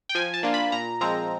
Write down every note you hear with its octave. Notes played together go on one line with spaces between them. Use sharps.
G5
F3 G#5
A5
A#3 D4 F4
B5
A#2 A#5
F3 G#3 C4 A#5